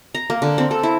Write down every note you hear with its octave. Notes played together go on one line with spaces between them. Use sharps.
A#5
A#3
D3
C4
A4
E4